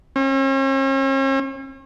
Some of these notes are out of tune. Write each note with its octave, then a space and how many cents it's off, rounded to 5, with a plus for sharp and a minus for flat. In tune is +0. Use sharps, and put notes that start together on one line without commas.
C#4 -45